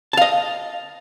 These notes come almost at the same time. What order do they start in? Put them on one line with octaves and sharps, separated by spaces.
A5 F5 D#5